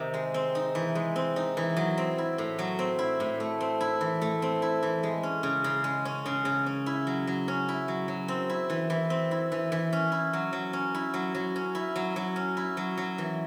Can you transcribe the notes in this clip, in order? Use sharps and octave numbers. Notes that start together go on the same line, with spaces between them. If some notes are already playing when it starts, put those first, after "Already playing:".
Already playing: C3 D#3 D#4
G#3
C4
D#4
E3
G#3
C4
D#4
E3
F#3
C4
E4
A2
F#3
C4
E4
A2
A3
C4
E4
E3
A3
C4
E4
E3
G#3
C#4
C#3
C#3
G#3
C#4
C#3
C#3
C#4
E4
F#3
F#3
C#4
E4
F#3
F#3
C4
E4
E3
E3
C4
E4
E3
E3
C#4
E4
F#3
F#3
C#4
E4
F#3
F#3
C#4
E4
F#3
F#3
C#4
E4
F#3
F#3
E3